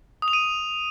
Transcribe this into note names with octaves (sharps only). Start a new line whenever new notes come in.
D#6
F7
D#7